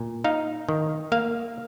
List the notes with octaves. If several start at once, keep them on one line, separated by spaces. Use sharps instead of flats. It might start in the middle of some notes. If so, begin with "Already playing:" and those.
Already playing: A#2
D#4 F5
D#3
A#3 F5